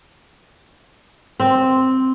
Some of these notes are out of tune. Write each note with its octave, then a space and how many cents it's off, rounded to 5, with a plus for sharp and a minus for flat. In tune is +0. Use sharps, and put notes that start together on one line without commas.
C4 +0